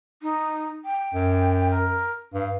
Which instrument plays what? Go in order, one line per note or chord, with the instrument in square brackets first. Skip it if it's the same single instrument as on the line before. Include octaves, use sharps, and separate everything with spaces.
[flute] D#4
G5
[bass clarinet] F#2
[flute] A#4
[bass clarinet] G2 [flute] F5